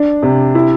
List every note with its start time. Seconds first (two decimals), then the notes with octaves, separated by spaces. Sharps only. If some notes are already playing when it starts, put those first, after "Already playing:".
Already playing: D4
0.23 C3
0.55 E4